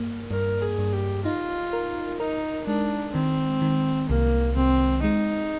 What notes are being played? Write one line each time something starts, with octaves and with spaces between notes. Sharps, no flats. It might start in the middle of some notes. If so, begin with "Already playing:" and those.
Already playing: G2 A#3
G2 A#4
G#4
G2
G4
D#4 F4
A#4
D#4 A#4
G#3 D4
D#3 C4
D#3
C2 A#3
C2 C4
G#3 D#4